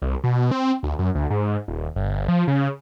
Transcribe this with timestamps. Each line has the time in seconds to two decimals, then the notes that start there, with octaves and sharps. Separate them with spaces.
0.02 C2
0.24 B2
0.51 C4
0.83 D2
0.99 F#2
1.15 D2
1.30 G#2
1.68 D#1
1.96 G1
2.28 F3
2.47 C#3